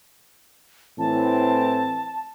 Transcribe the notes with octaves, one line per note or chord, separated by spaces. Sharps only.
A2 E3 C4 A5